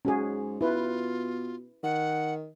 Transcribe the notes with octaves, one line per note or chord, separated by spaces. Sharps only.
G#2 C#4 F#4 G#4
B2 E4 F4 B4
D#3 F#5